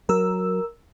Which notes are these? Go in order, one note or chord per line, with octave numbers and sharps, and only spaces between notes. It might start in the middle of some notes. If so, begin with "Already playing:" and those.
F#3 A#4 E6